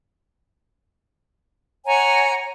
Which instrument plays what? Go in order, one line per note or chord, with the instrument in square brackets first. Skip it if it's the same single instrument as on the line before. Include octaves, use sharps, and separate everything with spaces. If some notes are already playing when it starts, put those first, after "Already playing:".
[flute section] C#5 F#5 G#5 A#5